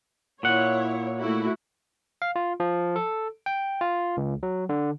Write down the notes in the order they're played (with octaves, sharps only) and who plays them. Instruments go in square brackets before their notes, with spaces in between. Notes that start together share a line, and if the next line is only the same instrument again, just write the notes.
[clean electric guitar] A#2 F#5 [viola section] E4 C#5
[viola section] A3 E4 F#4
[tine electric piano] F5
F4
F3
A4
G5
F4
C#2
F#3
D3